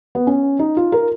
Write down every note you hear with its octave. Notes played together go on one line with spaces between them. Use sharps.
B3
C#4
D#4
F4
A#4